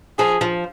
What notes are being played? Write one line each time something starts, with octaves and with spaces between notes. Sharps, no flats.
F3 G#4
F3